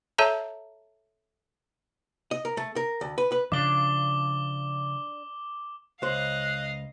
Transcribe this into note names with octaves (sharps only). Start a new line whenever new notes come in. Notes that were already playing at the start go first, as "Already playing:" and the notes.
A4 C#5 E5 A5 A#5
D#5
A#4
A3
A#4
D2
B4
B4
C#3 F3 D4 D5 D6 G7
C#2 C5 D#5 F5 F#6